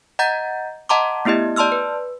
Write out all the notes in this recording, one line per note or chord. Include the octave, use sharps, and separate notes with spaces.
D#5 F#5 A#5 G6 A6
D#5 F#5 A5 A#5 C6 D6
A3 B3 E4 G4 D#5
D5 A5 C6 E6 F6
B4